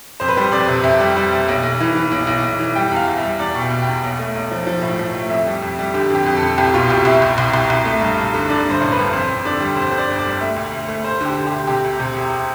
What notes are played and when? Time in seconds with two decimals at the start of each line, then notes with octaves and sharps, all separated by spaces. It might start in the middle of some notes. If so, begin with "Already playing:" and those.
0.20 F2 C5
0.29 B4
0.37 G3 C5
0.52 F2 D5
0.68 C3
0.84 F2 E5
1.00 G3
1.17 G3
1.32 G3
1.48 B1
1.63 B1
1.80 E3
1.95 E3
2.12 B1
2.27 B1
2.44 B1
2.60 E3
2.75 G3 G5
2.92 E2 F5
3.08 E2
3.18 E5
3.24 G3
3.39 E2 D5
3.55 B2
3.60 G5
3.71 B2
3.82 E2 G5
4.03 B1
4.19 A3
4.35 B1
4.51 F3
4.67 F3
4.82 A2
4.99 F3
5.15 A3
5.30 F2 E5
5.46 G3
5.62 F2
5.79 G3
5.94 D3 G4
6.10 F2 G4
6.26 F2
6.37 A4
6.43 F2
6.58 C2 G4
6.74 B2 F4
6.89 C2 G4
7.05 C2 E5
7.22 C2
7.38 C2
7.54 C2
7.70 C2
7.85 A3
8.01 G2
8.18 G2
8.34 D3
8.49 D3 D5
8.66 G2 C5
8.81 A1
8.92 G2 B4
9.13 F2 C5
9.29 F2
9.45 D3 D5
9.60 G3
9.76 F2 C5
9.91 D3 C5
9.98 D5
10.08 G1
10.19 D5
10.24 G3
10.40 A3 E5
10.56 D2
10.72 D2
10.88 A3
11.04 D2 C5
11.21 D3 G4
11.36 D3
11.47 D2 G4
11.67 C3 G4
11.84 D2
12.00 C3
12.15 E1